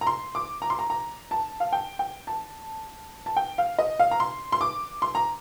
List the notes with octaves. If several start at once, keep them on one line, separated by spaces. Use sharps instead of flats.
A#5
C6
D6
A#5
C6
A#5
A#5
A5
F5
G5
G5
A5
A5
G5
F5
D#5
F5
A#5
C6
C6
D6
C6
A#5